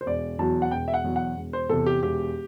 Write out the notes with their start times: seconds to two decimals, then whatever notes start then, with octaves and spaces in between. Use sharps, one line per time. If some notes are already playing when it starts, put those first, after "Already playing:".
0.01 C5
0.06 E1 D5
0.39 E2 B2 F#3 A5
0.62 F#5
0.71 E1 G5
0.88 E5
0.94 F#5
1.04 E2 B2 F#3
1.16 F#5
1.37 E1
1.53 C5
1.69 E2 C3 A4
1.86 G4
2.02 E1 G4